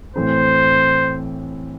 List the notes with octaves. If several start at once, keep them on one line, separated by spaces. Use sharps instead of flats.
A2 E3 A3 C4 C5